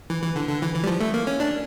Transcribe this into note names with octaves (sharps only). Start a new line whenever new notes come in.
E3
E3
D3
D3
E3
E3
G3
F3
A3
A#3
C#4
D4